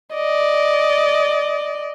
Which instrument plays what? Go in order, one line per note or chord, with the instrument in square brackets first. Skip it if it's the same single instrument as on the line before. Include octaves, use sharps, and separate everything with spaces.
[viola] D5 D#5